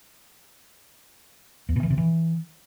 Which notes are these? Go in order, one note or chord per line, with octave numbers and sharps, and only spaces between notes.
E2
B2
E3
C3
E3